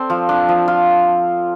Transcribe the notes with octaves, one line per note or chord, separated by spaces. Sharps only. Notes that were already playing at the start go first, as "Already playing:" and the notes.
Already playing: C4 A4 D5
F3
D4
F3
F4